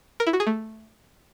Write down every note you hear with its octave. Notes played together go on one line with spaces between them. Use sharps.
A#4
E4
F#4
G#4
A3